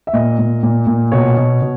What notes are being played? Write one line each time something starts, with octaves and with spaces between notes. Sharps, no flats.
E5
A#2 D#5
A#2
A#2
A#2
B2 C#5
B2
B2